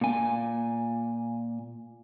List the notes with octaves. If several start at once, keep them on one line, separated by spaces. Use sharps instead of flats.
A#2 G#5